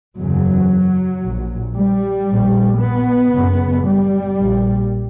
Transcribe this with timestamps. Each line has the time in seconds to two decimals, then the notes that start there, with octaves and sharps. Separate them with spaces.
0.18 F#1 E2 C#3 F#3
1.23 A#1 A#2
1.75 G3
2.28 A#1 A#2
2.79 B3
3.32 F#1 F#2 C#3
3.84 G3
4.37 A#1 A#2